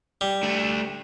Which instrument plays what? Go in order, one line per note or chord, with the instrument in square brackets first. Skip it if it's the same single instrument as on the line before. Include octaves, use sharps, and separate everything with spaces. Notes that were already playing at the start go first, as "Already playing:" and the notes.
[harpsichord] G3
[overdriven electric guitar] A3 D4